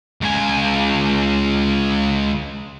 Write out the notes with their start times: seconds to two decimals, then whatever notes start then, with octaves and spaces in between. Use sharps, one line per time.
0.22 C#2 G#5